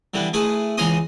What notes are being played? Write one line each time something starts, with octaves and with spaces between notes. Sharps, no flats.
D3 E3 G3 B3
A3 E4 G#4 B4
C#2 E3 G#5 A#5 C6 D#6